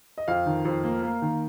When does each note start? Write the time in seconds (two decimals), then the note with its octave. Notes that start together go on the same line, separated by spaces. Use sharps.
0.18 D#5
0.28 F2 F5
0.46 D#3
0.65 F2
0.84 A#3
1.02 A#3
1.22 D#3